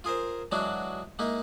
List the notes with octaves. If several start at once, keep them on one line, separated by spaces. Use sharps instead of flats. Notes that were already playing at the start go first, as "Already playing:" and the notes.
F4 G#4 A#4 C5
E3 F#3 G#3 D4 F#4
G#3 A#3 D#4 E4